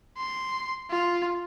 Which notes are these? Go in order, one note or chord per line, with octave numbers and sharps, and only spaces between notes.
C6
F4